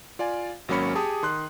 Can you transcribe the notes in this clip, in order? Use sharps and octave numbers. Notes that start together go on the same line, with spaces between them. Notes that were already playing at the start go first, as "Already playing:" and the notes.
F4 D5 F5 G#5
G#1 F#3 A#3 C#4 B5 C#7
G4 G#4 A5 D#6
D#3 C6 F#6